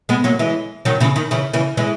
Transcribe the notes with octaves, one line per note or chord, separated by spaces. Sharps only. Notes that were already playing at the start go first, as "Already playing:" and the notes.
G#3 B3
F#3 A#3
E3 G#3
D#3 F#3
C#3 E3
D#3
C#3 E3
C#3 E3
E3 G#3